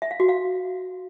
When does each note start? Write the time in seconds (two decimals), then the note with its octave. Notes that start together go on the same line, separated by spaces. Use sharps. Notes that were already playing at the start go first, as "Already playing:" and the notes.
0.02 E5
0.11 F5
0.20 F#4
0.29 F5